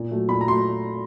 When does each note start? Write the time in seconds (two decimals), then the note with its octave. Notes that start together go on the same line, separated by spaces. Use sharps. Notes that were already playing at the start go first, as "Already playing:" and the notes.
Already playing: A#2
0.11 F#3 A3
0.28 A#2 B5
0.41 A#5
0.47 F#3 A3 C6